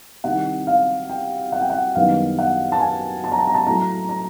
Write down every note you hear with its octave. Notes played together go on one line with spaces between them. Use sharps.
C2 C3 D#3 F#5
F5
G5
F#5
G5
F#5
F#2 D#3 G3 B3 E4 F5
F#5
A5
G#5
A5
A#5
A5
A#5
A5
A2 F#3 A3 A#5
A#5